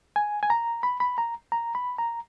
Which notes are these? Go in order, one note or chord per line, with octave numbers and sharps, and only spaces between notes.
G#5
G#5
A#5
B5
B5
A#5
A#5
B5
A#5